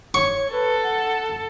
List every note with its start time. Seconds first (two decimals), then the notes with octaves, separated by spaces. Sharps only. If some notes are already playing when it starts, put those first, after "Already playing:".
0.14 C#5 C#6
0.52 A4 B4
0.83 F#5